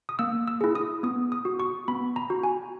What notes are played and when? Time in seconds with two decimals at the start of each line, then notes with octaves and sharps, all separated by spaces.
0.09 D#6
0.19 A#3 E6
0.48 E6
0.61 E4 G#4
0.75 D#6
1.03 B3 D#6
1.32 D#6
1.45 F#4
1.60 C#6
1.88 B3 B5
2.16 A#5
2.30 F#4
2.44 G#5